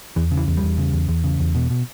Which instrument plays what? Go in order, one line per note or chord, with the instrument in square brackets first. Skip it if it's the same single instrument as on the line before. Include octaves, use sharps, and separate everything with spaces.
[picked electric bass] E2 E3
C#3
E3
E2
G3
E2
C#3
E2
E2
C#3
E2
B2
B2